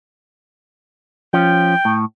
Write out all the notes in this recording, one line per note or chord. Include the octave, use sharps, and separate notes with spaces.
F3 C#4 F4 G5
A2